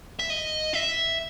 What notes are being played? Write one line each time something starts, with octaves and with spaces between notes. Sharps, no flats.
E5
D#5
E5